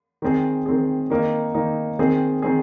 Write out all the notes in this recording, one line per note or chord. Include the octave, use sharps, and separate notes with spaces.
D#3 C4 G#4
D#3 C4 G#4
D#3 A#3 D#4
D#3 A#3 D#4
D#3 C4 G#4
D#3 C4 G#4